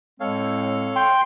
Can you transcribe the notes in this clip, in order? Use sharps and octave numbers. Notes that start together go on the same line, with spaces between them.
A2 G#3 C4 A4 C#5 F5
G5 C6